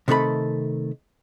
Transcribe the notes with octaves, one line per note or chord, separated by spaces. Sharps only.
C3 D#3 A3 A4 B5